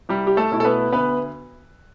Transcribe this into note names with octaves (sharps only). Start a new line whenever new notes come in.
C2 G3 G4
G4
A3 A4
B2 A3 E4
A4
B3 B4
D2 B3 B4